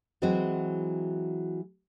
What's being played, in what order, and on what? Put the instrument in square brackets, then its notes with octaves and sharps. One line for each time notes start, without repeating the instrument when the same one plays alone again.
[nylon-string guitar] E3 F#3 G#3 C4 E4 F#4